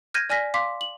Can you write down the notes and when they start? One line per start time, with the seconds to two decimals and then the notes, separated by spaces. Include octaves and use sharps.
0.14 F6 G6 G#6 A#6 D#7
0.30 D5 G#5 F6 A#6 B6
0.54 F5 C6 D6 B6
0.81 F#7